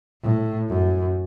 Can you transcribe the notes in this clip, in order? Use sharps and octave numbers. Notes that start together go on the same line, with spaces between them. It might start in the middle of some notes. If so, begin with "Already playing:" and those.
A2
F#2